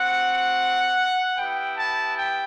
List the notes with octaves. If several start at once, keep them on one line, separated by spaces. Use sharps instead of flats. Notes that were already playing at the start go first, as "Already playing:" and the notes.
Already playing: C4 F#4 F#5
B3 E4 G4 G5
A5
G5